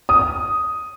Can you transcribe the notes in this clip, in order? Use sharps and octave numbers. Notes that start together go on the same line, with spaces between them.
D#6